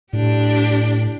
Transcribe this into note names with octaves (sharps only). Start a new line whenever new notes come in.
A2 D4 G4